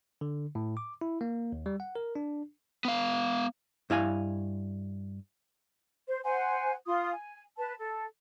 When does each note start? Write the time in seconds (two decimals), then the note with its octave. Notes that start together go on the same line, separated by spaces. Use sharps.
0.21 D3
0.55 A2
0.77 D6
1.01 E4
1.21 A#3
1.52 D#2
1.66 G3
1.80 F#5
1.96 A#4
2.15 D4
2.85 B3 F5
3.90 G2 E4 F5 G#5
6.08 C5
6.24 C5 F#5 G#5
6.87 F4 C6 D#6
7.13 G#5
7.57 B4 A5
7.79 A4